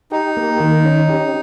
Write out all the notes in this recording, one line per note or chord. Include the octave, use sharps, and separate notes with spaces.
D#4 G4
A#3
D#3
C#4
G4